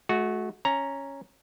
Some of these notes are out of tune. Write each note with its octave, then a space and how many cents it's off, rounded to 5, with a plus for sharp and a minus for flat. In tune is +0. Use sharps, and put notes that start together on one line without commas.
A3 -45 F#4 -10
C#4 -5 A#5 +0